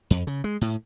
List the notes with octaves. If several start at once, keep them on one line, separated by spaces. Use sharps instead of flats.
F2
C#3
G#3
A2